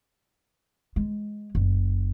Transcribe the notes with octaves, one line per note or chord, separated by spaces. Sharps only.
G#3
F#1